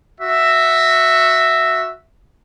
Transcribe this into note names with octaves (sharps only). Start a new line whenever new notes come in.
F#4 E5